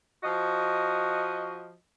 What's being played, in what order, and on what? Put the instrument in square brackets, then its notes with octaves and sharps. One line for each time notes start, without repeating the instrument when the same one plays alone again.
[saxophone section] F3 F#4 D#5